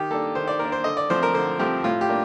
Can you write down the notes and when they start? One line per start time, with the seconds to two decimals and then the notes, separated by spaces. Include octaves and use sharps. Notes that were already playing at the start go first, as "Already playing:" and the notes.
Already playing: D#3 G4
0.11 A#3 D4 A4
0.35 D#3 C5
0.48 D5
0.59 A#3 D4 A#4
0.72 C5
0.84 D3 D#5
0.97 D5
1.09 F3 A3 C4 C5
1.23 A#4
1.34 D3 C5
1.59 F3 A3 C4 G4
1.84 A2 F4
2.01 G4
2.09 A#3 D4